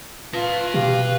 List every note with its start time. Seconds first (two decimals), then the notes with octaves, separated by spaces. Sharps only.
0.33 F4 B4 A5
0.74 B2 G4 F5